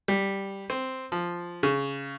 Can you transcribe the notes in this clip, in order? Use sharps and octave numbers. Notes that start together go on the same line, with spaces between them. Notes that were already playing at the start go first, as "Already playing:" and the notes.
G3
C4
F3
C#3